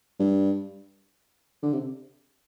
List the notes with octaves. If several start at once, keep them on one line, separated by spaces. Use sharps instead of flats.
G2
D3
C3